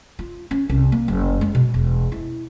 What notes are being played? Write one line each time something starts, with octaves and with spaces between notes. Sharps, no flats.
F4
C#4
C2
A#3
F#1
G#3
B2
E1
E4